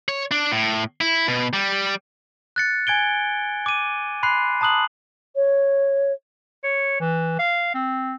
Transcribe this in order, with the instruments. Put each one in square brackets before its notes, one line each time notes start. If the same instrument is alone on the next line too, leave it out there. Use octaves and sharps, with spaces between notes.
[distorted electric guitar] C#5
D4
A2
E4
B2
G3
[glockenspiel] F#6 A6 C#7
G#5 G#6 D7 G7
D6 D#7
B5 C6 F#6 C7
A5 A#5 D#6 F#6 F#7
[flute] C#5
[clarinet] C#5
E3
F5
C4